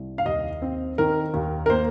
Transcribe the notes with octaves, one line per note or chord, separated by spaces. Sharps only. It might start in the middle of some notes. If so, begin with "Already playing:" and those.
Already playing: C2
F5
D#2 D#5
C4
D#3 A#4
D#2
A#4
A#3 C5